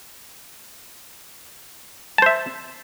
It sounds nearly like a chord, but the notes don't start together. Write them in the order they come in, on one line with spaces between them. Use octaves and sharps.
A5 C5 E5